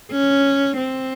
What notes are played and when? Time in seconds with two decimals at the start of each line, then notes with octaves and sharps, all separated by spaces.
0.11 C#4
0.76 C4